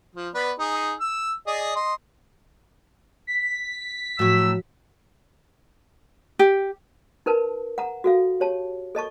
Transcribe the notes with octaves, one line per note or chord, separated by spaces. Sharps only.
F3
B3 B4 D5
D#4 G#4
E6
G#4 D5 D#5
D#5 C6
B6
A2 F3 F#3 F#4 E6
G4
D#4 A#4 B4 A5
F#5 A#5
F#4 A4 F5
G4 C#5 A5
A4 D#5 A5 C#6